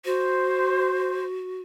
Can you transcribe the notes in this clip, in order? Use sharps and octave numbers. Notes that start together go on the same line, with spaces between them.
F#4 C5